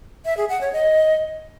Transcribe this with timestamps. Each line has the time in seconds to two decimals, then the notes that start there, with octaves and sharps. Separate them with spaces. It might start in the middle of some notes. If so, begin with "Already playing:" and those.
0.25 E5
0.37 G#4
0.49 F#5
0.61 C#5
0.73 D#5